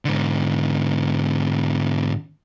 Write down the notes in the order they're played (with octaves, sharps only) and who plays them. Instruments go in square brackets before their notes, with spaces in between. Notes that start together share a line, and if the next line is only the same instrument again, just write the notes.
[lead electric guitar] G#2 D3